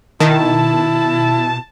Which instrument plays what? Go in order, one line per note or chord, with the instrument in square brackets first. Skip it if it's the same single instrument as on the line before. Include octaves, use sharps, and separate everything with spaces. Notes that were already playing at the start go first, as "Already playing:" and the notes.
[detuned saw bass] B2 [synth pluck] D#3 [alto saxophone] E4 [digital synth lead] A5